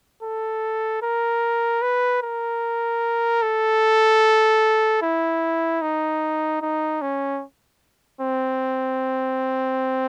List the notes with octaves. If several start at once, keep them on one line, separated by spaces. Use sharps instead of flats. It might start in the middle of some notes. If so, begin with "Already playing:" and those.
A4
A#4
B4
A#4
A4
E4
D#4
D#4
C#4
C4